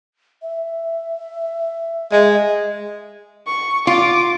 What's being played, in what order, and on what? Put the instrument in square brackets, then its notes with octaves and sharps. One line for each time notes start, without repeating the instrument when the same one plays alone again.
[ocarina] E5
[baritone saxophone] G#3 [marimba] D#5
[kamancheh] C#6
[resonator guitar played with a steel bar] F4 [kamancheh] D6